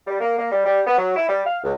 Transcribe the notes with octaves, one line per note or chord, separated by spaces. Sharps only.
G3
A#3
A#3
G3
G3
B3
F#3
E4
G3
F5
C#2